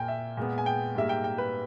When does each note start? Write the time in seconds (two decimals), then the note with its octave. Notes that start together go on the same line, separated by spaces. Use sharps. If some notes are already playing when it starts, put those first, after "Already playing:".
Already playing: A#2 A#3 G5 G#5
0.08 E5
0.37 A#2 G#3 B3
0.58 G#5
0.66 G5
0.95 G#2 G3 A#3 E5
1.09 G5
1.24 G5
1.38 B4